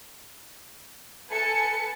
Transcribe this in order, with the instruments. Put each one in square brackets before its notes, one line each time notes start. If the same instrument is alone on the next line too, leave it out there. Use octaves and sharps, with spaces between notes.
[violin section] A4 B4 G#5 A5 C#7